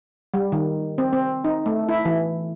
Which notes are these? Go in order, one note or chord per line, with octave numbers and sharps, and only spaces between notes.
G3
D#3
C4
C4
D#4
A3
E4
E3